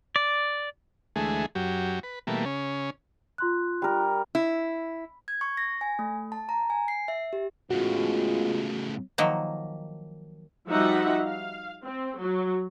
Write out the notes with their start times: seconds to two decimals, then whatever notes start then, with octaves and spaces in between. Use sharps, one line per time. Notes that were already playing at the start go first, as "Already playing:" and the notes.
0.16 D5
1.16 D2 E3 G#3 A3 G#4
1.55 F#2 F#3 G4
2.03 B4
2.27 B2 E3 G3 A3 A#3
2.45 C#3 C#4
3.38 F4 C6 F#6
3.82 G3 A#4
4.35 E4
5.28 G#6
5.41 C#6
5.57 A#6
5.81 G#5
5.99 A3
6.32 A5
6.49 A#5
6.70 G#5
6.88 C7
7.08 E5
7.33 G4
7.71 A2 C#3 G#3 B3 F4 F#4
9.18 D#3 F3 F#3 A#3
10.69 F3 G3 D#4 F#4 E5 F#5
11.24 F5
11.84 C4
12.19 F#3